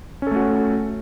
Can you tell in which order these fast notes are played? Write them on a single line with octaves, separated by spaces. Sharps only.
C#4 A4 A3 F#4